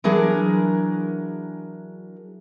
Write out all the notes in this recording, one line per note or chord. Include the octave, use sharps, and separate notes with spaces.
E3 F#3 D4 G#4 A#4